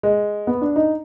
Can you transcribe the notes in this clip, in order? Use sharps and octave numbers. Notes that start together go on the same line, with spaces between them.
G#3
B3
D4
D#4